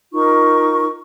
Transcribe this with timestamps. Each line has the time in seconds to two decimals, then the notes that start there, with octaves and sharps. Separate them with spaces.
0.13 D#4 F4 A#4 C#6